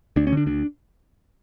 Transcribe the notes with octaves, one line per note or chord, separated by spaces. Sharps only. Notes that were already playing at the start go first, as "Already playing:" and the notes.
D2 D4
C#4
D3 D4
D2 D4